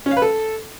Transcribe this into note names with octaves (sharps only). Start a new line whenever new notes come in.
C#4
F5
B4
A4